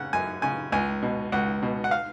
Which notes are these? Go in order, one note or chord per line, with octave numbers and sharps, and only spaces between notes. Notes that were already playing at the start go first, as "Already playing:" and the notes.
Already playing: C#3 F#5
F#2 G#5
C#3 G#5
C#2 G#5
B2
C#2 F#5
B2
F#5
F5